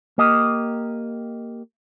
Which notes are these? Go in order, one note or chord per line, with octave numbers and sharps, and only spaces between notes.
A#3 G4 D#5